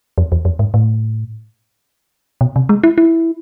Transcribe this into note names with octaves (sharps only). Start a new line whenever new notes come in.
F2
E2
F2
G#2
A2
B2
C3
G#3
E4
E4